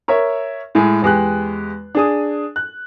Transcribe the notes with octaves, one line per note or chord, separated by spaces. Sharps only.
A#4 C#5 E5
A2 G#3
E2 G#3 G4 F#6
D4 G#4 D#6
F#6